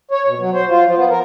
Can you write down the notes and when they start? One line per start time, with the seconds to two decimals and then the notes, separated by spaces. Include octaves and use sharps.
0.11 C#5
0.27 B2
0.39 F#3
0.53 C5
0.70 F4
0.84 F3
0.97 B3
1.10 A#4